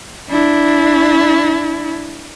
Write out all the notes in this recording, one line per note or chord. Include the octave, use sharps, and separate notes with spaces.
D4 E4